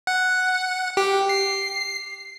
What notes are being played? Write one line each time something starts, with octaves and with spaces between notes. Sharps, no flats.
F#5
G4
C7